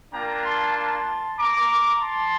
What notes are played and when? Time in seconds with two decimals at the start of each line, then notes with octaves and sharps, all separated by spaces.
0.13 A#3 D4 F4 G5 A#5
0.44 A5 C6
0.75 A5 C6
1.38 A#5 D6
2.01 A5 C6